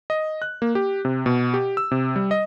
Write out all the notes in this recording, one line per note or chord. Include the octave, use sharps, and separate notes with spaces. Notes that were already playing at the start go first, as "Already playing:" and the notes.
D#5
F#6
A#3
G4
C3
B2
G4
E6
C3
G3
D#5